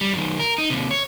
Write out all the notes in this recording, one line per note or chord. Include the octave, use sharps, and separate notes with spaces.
G3
F#2 D#3
A#4
D#4
D#2 C3
C#5